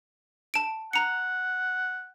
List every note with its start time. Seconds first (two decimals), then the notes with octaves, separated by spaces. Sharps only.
0.54 A5 D7
0.93 F#5 A#5 C#7